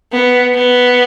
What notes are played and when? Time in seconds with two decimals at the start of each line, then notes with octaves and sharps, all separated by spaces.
0.12 B3
0.54 B3